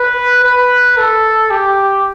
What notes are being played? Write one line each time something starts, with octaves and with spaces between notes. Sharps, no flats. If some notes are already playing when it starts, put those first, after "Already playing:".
Already playing: B4
B4
A4
G4